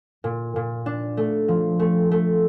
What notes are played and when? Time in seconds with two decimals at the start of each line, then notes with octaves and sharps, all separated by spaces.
0.24 A#2
0.56 A#2
0.86 D4
1.17 A3
1.48 F3
1.79 A3
2.11 A3